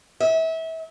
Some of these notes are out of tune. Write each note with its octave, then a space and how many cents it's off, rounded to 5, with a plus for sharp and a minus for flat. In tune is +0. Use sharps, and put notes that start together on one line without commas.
E5 -30